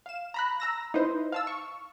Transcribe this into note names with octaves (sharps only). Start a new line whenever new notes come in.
F5 E7
A#5 B5 F#6
A#5 E6 A#6
D#4 E4 B4 C5
F5 A5 E6
C#6